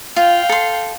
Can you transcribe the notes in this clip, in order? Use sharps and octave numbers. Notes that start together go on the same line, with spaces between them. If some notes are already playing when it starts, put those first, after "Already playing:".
F4 F5 G5
A4 C6